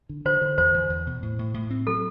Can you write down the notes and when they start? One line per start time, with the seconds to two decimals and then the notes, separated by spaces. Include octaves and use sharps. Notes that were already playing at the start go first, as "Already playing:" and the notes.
0.09 D3
0.25 D3 C5
0.41 D3
0.58 E2 C5
0.74 E2
0.90 E2
1.07 B2
1.23 A2
1.39 A2
1.54 A2
1.70 C4
1.87 F#3 A4